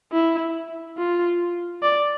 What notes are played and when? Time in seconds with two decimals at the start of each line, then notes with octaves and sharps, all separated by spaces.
0.13 E4
0.98 F4
1.83 D5